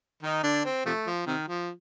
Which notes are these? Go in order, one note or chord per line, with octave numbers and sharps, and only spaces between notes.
D#3 D#4
D3 D4
C4
C3 F3 A3
F3
C3 D#3
F3